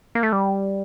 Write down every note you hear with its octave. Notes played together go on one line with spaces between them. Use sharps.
A#3
A3
G3